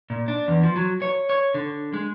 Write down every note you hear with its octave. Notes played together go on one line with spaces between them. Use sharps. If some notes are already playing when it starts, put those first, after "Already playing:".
A#2
D4
E2
F3
F#3
C#5
C#5
D3
G#3